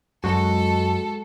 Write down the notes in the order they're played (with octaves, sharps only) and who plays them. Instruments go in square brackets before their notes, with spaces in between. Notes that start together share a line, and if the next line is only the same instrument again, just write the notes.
[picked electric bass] F#2 [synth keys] G#3 F#4 [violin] A4